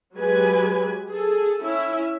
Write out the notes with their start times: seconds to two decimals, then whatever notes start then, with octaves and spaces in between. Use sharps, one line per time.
0.16 F#3 G#3 G4 B4 G#5
1.11 G#4 A4
1.63 C#4 E4 E5